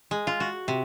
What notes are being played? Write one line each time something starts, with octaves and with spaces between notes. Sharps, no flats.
G#3
F4
F#4
C3